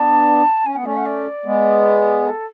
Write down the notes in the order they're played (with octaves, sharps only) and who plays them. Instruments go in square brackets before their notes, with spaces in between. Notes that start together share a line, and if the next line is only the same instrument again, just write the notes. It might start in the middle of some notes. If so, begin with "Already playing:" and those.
Already playing: [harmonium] B3 D4 [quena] A5
[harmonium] C#4 [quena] G#5
[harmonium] B3 [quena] F#5
[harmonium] A3 C#4 [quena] D5
[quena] F#5
D5
[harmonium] G#3 B3
[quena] A4